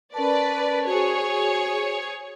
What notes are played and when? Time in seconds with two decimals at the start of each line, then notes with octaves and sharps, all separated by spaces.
0.14 C#4 A#4 B4 D5 A5
0.86 F#4 G#4 C5 C#5 G#5